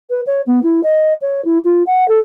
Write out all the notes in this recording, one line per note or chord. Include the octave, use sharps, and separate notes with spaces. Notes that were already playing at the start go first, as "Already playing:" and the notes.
B4
C#5
B3
E4
D#5
C#5
E4
F4
F#5
A4